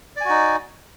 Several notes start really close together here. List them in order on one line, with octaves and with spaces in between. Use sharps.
D5 G#5 F#4 D#4